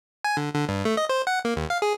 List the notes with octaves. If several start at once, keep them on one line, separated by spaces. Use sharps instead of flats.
G#5
D3
D3
G2
A3
D#5
C5
F#5
A#3
D#2
F5
G#4